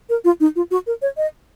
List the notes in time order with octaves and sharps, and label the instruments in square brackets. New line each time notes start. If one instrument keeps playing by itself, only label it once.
[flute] A#4
F4
D#4
F4
F#4
A#4
C#5
D#5